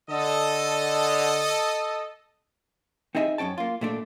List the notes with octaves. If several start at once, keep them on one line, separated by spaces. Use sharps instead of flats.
D3 A4 D#5
C4 D#4 G#4 D#5 E5 G#5
F#2 C4 C#4 G5 A5
A#3 F4
A#2 A3 D4